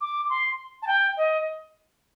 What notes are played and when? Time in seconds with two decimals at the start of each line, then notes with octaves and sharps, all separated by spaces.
0.01 D6
0.29 C6
0.82 A5
0.87 G5
1.17 D#5